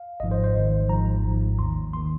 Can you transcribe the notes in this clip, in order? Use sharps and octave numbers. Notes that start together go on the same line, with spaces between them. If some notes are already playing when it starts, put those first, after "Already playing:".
Already playing: F5
G#1 G#2 F3 D#5
C5
C5
G#1 G#2 D#3
G#1 G#2 F3 A#5
G#1 G#2 F3
D#2 D#3 C6
D#2 D#3 C6